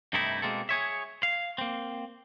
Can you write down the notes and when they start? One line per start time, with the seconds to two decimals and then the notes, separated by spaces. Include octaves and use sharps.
0.13 G2 C3 G3 A3 D#4 E4
0.42 B2 G#3 A#3 C4 A4
0.69 G#4 C#5 E5
1.23 F5
1.58 A#3 C4